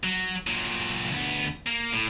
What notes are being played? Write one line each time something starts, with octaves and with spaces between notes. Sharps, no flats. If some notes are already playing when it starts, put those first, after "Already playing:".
F#3
A#2 F#3
D2 B3
A#3
A2